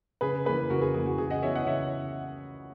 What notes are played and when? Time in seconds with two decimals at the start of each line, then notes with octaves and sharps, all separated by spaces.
0.21 C#3 G#4 B4
0.45 E3 A#3 G#4 B4
0.70 C#3 F#4 A#4
0.82 G#4
0.94 E3 A#3 G#4
1.06 F#4
1.18 C#3 G#4
1.30 D#5 F#5
1.43 E3 B3 C#5 E5
1.55 D#5 F#5
1.66 C#3 C#5 E5